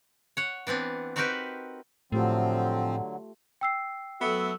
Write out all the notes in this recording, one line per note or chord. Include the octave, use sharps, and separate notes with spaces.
C#5 F#5
E3 B3 C4 D4
C4 D#4 F#4 G4 A#4 B4
A2 D3 F3 F#3 A3 C4 F4 G4
G5 E6 C7
F#3 A3 B3 F#4 A4 E5